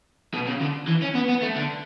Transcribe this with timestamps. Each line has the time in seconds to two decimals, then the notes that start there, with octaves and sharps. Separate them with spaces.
0.34 B2
0.47 C#3
0.61 D3
0.88 E3
1.02 C#4
1.15 B3
1.29 B3
1.43 A3
1.57 D3